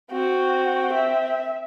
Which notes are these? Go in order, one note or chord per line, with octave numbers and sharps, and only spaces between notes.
C4 F#4
E5